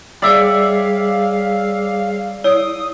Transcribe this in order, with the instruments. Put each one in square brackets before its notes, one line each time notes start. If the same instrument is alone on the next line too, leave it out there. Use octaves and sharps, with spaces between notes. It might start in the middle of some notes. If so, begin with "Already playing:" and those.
[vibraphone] G3 G#4 C#5 [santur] D5 E5 D6 [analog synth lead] F5
[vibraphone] E4 D5 [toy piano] C#5 [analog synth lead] D#6